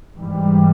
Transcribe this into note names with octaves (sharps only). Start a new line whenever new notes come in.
G#2 E3 G3